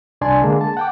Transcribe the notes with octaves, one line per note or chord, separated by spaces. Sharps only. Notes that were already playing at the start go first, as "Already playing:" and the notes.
C2 D4 D5 G#5 A5 C6
D3 G#3 A#3 G#4
A5
F#5 G5 D6